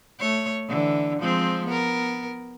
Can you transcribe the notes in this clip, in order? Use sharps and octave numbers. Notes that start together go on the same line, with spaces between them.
A3 C#5
D3 E3
F3 G#3 C4
B3 A#4